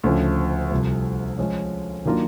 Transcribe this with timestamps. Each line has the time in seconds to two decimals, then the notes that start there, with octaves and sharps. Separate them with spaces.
0.03 D2 C#3 F3
0.71 C2 C3 F3
1.38 F3 G#3 C#4
2.05 D#3 F#3 A#3 D4 F4